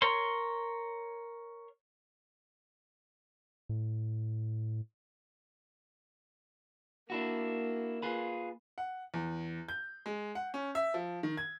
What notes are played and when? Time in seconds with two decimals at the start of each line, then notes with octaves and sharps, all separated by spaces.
0.02 A#4 C#5 C6
3.69 A2
7.10 A#3 D4 E4 F#4
8.02 F4 G#4 B4
8.78 F#5
9.14 E2
9.68 G6
10.06 G#3
10.35 F#5
10.54 C#4
10.75 E5
10.94 F3
11.23 D#3
11.37 G#6